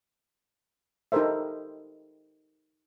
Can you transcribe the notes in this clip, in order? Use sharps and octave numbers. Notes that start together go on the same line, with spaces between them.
D#4 G4 A4 A#4 C5 E5